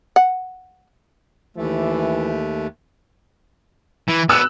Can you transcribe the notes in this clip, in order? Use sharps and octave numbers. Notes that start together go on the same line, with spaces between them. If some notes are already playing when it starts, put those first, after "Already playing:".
F#5
D#2 E3 A3
E3
B3 D4 E6 F#6